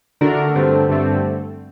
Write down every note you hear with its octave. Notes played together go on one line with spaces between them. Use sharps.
D3 A3 D4 F#4 A#4
G2 D3 A3 C4
G2 D3 A3 C4